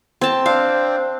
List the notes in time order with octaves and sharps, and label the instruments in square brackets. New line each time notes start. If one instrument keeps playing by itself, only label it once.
[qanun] C4 A5
[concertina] C4 D4 C5 [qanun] F5